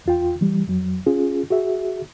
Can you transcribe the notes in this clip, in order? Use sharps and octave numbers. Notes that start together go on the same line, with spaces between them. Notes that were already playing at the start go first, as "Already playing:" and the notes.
E2 F4 G5
E3 G3
F2 F#3
C#4 F4 G#4
F#4 G#4 E5